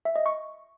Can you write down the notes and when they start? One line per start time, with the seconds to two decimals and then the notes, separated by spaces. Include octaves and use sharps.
0.05 E5
0.16 D#5
0.26 C#6